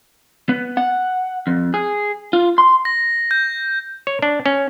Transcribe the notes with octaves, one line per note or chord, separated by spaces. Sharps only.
B3
F#5
F2
G#4
F4
C6
A#6
G6
C#5
D4
C#4